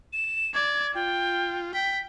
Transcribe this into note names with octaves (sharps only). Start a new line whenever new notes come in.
E7
D5 G#6
F4 G5
G5 B6